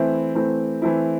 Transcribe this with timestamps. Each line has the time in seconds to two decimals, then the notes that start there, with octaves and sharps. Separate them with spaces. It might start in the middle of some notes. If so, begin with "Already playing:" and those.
Already playing: E3 A3 C4 E4
0.35 E3 A3 C4 E4
0.82 E3 A3 C4 E4